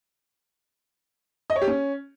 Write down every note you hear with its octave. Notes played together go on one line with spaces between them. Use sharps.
D#5
C#5
G4
C#4